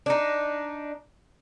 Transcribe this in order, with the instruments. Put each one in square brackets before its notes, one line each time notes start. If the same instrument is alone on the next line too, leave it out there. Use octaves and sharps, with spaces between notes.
[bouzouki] D4 D#4